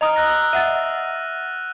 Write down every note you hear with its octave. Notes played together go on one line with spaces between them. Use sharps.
D#5 A#5 D#6 F6 D7 F7
E6 F#6 A#6
E5 F#5 A6 D#7